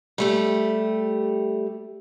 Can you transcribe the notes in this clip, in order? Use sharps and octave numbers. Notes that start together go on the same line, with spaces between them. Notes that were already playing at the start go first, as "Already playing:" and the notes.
G3 A3 G4